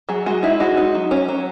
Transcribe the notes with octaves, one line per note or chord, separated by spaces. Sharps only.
F#3 G#4
G#3 F#4
D#4 E4
G#3 F#4
D#4
F#3
C#4
F#3